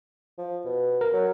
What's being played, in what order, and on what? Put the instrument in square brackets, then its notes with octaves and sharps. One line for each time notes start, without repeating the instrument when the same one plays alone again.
[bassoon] F3
B2
[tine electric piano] A#4
[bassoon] F#3